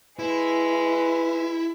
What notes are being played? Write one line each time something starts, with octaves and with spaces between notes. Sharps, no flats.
G#3 E4 B4